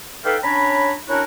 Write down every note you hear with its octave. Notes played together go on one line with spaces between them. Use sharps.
D#4 A4 B4 F5 G5
C#4 D4 C#5 A#5 B5
C#4 D4 E4 F#4 A#4 C#5